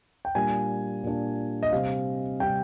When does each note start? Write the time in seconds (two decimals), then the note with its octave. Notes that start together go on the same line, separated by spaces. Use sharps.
0.25 G5
0.35 A#2 G3 A#3 D4 G#5
1.04 A#2 G3 A#3 D4
1.63 D#5
1.72 C3 G3 C4 F5
2.40 C3 G3 C4 G5